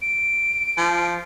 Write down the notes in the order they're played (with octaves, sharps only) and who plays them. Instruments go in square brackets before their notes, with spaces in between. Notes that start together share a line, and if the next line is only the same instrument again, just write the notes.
[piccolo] D7
[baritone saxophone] F3